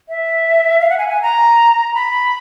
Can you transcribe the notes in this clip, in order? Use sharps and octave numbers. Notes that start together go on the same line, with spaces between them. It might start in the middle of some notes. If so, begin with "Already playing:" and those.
E5
F5
F#5
G#5
G#5
A#5
B5